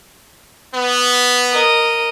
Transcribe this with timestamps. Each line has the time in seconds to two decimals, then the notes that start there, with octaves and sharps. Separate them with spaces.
0.74 B3
1.53 A#4 D#5